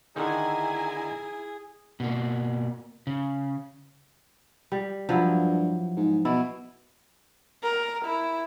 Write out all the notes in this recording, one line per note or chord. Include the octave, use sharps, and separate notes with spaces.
D3 D#3 D#4 E4 G#4 G#5 A#5
B2 A#3
C#3
G3
G2 F3 F#3 E4
G#2
B2 E4
A#4
E4